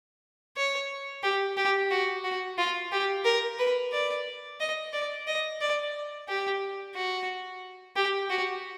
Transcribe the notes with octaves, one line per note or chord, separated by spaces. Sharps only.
C#5
G4
G4
F#4
F#4
F4
G4
A#4
B4
D5
D#5
D5
D#5
D5
G4
F#4
G4
F#4